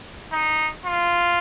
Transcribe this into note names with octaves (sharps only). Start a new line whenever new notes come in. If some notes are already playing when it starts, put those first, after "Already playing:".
D#4
F4